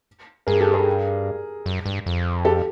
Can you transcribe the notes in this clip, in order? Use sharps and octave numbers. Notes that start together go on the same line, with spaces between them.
G2 G#4 A#4
G4 A4
G#4 A#4
F#2
G2
F2
G4 A4